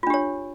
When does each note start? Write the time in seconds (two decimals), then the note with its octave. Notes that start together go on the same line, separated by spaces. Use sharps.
0.03 F4
0.07 D4
0.10 G4
0.14 C#5